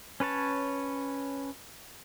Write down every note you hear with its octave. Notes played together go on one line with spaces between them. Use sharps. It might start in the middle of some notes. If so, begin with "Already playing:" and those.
C#4 B4 C#5 A5